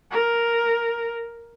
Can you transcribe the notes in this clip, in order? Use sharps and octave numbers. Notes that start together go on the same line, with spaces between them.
A#4